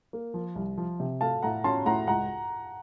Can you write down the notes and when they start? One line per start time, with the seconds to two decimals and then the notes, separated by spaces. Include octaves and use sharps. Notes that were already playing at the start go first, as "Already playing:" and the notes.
0.13 A#3
0.34 F3
0.56 C2
0.78 F3
1.00 C3
1.21 A3 F5 A5
1.43 A2 F#5 A#5
1.64 C#4 A5 C6
1.86 A2 F#5 A#5
2.07 C#2 F#5 A#5